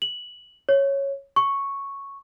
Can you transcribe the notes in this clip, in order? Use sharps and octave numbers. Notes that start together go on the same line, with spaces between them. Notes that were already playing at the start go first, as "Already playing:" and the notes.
F#7
C#5
C#6